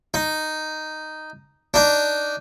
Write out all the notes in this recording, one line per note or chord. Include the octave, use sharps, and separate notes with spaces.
D#4
D4 D#4